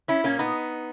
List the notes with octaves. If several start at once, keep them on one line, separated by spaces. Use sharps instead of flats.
C#4 E4
A#2 A#3 C#4
B3 D#4